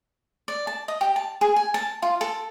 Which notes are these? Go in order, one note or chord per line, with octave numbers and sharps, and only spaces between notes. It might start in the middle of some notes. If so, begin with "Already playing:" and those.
D5
A5
D#5
G4
A5
G#4
G#5
A5
F4
A4